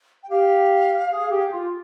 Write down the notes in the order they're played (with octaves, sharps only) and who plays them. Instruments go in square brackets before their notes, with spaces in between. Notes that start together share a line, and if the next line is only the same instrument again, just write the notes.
[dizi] G5
[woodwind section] G4 [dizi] F5
[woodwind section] G#4
G4
F4